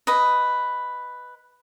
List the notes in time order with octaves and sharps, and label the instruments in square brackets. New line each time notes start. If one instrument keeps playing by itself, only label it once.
[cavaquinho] B4 D#5